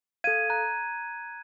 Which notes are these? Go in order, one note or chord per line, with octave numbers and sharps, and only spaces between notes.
A4 F5 G#6 D#7
A#5 F#6